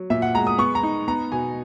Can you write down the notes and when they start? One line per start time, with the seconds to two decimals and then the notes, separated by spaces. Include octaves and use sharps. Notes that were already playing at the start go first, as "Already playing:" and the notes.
Already playing: F#3
0.10 A#2 E5
0.22 F#5
0.34 G#3 A#5
0.47 D#6
0.58 B3 C#6
0.75 A#5
0.83 D#4
1.08 B3 A#5
1.32 B2 G#5